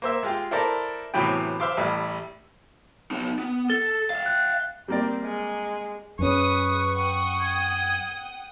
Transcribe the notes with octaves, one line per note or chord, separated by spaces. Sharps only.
A#3 C5 E5
G#3 F4 G4
E4 A4 A#4 C5 D5
A2 C3 E3 F#3 B3 G5
C5 E5 F5 C6 D6
A1 G3 E4
B3 D#4
B3
A4 A6 G7
E5 F5
F#6
G3 A#3 C4 D5
G#3
F#2 C#4 G#4 B4 C#6 D#6
F#5 G5 D#6
G#6